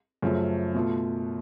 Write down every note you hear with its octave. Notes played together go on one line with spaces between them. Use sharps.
F#2 C#3 F3 A3
B2 A3 F4